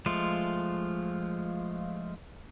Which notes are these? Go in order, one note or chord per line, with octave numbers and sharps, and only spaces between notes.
F3 G#3 A3 F4